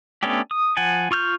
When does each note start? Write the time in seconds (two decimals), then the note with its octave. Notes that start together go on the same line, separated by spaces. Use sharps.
0.23 A3 B3 C#4 D4 G4
0.51 D#6
0.77 F3 F#5 G#5 A5
1.11 F4 C#6 F6 G6